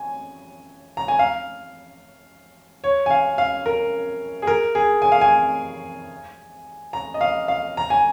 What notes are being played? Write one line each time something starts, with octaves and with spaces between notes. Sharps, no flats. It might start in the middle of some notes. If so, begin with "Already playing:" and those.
Already playing: G#5
A#5
G#5
F5
C#5
G#5
F5
F5
A#4
G#4
A#4
G#4
G#5
F5
G#5
A#5
D#5
F5
F5
A#5
G#5